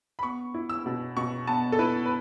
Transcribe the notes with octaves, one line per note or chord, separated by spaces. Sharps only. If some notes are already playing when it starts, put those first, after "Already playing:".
B5
B3 C#6
E4
E6
B2
B2 C#6
B3 A5
A4
E4 B4
B4